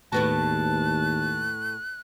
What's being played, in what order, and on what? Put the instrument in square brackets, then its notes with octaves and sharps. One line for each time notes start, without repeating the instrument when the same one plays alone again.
[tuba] D#2 [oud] A2 B3 F#4 [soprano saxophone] A5 [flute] F#6